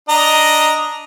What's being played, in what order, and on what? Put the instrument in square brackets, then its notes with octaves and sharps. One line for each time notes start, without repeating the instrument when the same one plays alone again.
[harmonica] D4 D#5 A#5